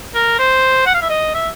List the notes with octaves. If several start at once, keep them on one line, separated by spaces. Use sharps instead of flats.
A#4
C5
F#5
F5
E5
D#5
E5